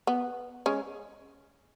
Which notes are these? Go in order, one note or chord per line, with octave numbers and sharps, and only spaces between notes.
B3
G#3 C#4